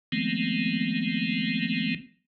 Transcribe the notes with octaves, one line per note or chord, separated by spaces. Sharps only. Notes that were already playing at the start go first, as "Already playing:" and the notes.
D#3 F3 G#3 A3 B3 C4